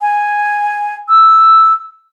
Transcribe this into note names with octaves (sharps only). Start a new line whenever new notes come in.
G#5
E6